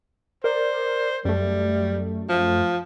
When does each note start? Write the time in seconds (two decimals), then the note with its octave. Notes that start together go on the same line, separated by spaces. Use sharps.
0.44 A#4 C5 D5
1.25 F#2 G3 A3
2.29 F3